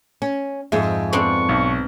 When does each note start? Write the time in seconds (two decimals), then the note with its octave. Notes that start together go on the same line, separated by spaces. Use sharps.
0.22 C#4
0.72 F2 G#2 G#4 E5
1.13 B3 C4 D4 C#6
1.49 B1